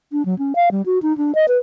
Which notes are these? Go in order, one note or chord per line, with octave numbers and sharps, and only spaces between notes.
D4
F#3
C#4
F5
G3
F#4
D#4
D4
D#5
B4